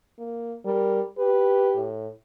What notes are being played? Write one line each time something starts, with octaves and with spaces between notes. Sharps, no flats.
A#3
G3 A#4
G4 B4
A2